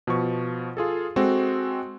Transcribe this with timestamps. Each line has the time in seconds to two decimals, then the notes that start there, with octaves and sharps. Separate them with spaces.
0.07 B2 F3 C#6
0.77 F4 G#4 A4
1.16 G#3 C4 F#4 A4